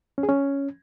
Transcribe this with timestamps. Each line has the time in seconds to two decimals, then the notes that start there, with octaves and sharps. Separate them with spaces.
0.18 C#4
0.23 G#4
0.29 C#4